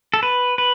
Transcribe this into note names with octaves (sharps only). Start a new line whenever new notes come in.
A4
B4
B4